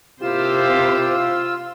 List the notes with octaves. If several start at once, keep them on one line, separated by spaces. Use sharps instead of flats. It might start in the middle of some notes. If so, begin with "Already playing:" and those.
C3 A#3 E4 F4 G4 C5 E6